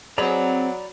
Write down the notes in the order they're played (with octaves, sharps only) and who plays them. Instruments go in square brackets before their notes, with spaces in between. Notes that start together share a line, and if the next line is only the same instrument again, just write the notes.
[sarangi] F#3 [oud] C4 G#4 D#5 [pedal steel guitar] D5 A#5 B5